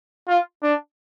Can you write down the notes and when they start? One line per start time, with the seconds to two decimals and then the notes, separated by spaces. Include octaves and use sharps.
0.28 F4
0.63 D4